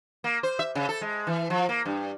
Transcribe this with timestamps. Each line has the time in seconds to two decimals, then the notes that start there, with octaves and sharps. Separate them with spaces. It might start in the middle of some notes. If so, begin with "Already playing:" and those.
0.24 A#3
0.43 C5
0.59 E5
0.75 C#3
0.89 A4
1.01 G#3
1.27 E3
1.50 F3
1.69 A#3
1.85 G2